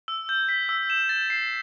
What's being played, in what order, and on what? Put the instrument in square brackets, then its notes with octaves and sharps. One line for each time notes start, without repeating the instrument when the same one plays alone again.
[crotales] E6
G6
B6
E6
E7
A6
C7